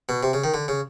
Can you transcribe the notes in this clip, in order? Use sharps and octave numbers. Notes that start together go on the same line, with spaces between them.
B2
C3
C#3
D#3
D3
C#3